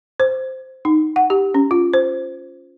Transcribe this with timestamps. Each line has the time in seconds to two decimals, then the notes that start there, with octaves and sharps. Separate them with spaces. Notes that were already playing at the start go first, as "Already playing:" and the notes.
0.20 C5
0.85 D#4
1.16 F#5
1.30 G4
1.54 C#4
1.71 F4
1.93 C5